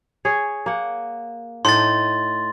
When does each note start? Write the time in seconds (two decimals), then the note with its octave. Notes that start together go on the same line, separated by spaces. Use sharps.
0.25 G#4 C#5
0.66 A#3 F#5
1.65 A2 D#4 C6 A6